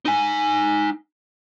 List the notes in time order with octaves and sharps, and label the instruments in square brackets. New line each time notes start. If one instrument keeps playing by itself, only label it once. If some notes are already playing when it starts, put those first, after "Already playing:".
[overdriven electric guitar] D#4 G#5